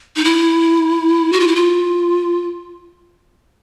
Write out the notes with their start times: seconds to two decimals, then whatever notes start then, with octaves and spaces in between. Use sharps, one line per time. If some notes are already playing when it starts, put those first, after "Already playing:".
0.16 D#4
0.24 E4
1.32 F#4
1.40 F4
1.47 E4
1.55 F4